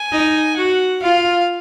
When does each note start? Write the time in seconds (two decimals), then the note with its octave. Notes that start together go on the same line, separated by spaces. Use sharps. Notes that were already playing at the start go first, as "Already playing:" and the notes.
Already playing: G#5
0.12 D#4
0.57 F#4 F#5
1.02 F4 F5